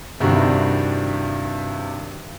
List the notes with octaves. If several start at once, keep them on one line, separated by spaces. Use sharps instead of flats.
G2 C3 D#3 D4 E4 F#4